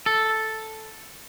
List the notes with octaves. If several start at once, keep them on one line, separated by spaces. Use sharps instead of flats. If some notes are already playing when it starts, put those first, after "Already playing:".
A4